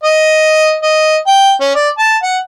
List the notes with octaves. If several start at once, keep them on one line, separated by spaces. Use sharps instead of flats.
D#5
D#5
G5
C#4
D5
A5
F#5